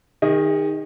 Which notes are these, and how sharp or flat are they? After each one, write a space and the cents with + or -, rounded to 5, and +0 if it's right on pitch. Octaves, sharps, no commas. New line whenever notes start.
D#3 +0 G#4 -45 D#5 +0